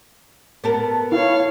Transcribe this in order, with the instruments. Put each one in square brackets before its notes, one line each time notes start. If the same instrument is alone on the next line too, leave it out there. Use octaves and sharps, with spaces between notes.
[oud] B3 A4 A#4
[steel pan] E4 [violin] C#5 F5